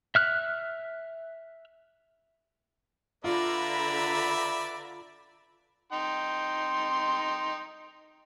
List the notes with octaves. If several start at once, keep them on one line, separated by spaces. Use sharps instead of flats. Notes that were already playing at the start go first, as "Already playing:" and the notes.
E5 F6 F#6
D3 F4 B4 D5 E5 A#5 B5
D#4 G5 C6